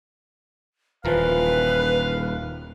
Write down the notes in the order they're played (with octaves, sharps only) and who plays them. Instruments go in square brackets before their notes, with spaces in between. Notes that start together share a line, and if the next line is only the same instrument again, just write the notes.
[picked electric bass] D#1 [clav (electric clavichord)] E3 F3 A#4 [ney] B4 [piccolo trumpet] F5